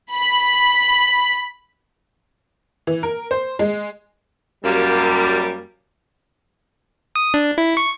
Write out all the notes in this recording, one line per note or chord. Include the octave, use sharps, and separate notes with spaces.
B5
E3
A#4
C5
G#3
F#2 G3 A#3
D#6
D4
E4
C#6